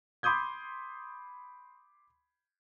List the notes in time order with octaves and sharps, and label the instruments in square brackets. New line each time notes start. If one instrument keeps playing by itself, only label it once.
[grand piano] B5 C6 D6 D#6 G6 G#6